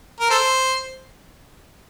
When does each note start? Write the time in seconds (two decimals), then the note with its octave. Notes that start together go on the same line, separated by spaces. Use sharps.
0.20 A#4
0.30 A4 C5